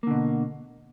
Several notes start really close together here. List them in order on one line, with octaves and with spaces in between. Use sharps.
A#3 D3 B2